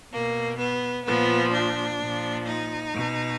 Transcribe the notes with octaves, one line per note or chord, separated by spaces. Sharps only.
B2 A#3
B3
A#2 F3 B3
D4
A#2 F3
D#4
B2